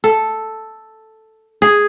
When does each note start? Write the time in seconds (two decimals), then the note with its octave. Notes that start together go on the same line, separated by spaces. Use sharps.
0.04 A4
1.62 G#4